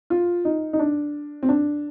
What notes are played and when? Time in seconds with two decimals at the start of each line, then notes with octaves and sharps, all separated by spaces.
0.10 F4
0.45 D#4
0.73 D#4
0.79 D4
1.43 C4
1.49 D4